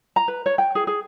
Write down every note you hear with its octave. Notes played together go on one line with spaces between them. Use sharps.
A#5
B4
C#5
G5
G#4
G#4